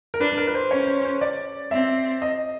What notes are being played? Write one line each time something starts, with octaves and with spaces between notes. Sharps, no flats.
A#4
D4 B4
A#4
B4
C5
C#4 C#5
C5
C5
D5
C4 E5
D#5